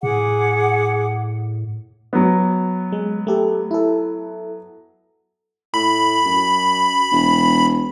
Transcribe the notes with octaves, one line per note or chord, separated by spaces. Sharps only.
A2 G#4 F#5 D6
F#3 B3
G#3
A3 G4 A4
E4 A4
A2 B5
F#2
E1